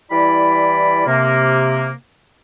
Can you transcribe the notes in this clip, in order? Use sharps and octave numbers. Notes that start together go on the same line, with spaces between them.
E3 G3 E4 D5 B5
C3 A#3